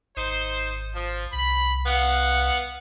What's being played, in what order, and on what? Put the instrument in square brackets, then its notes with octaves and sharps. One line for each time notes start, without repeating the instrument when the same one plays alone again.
[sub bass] G#1 [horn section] D#4 C5
[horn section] F3
[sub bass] C2 [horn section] B5
[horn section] B3 F5 F#5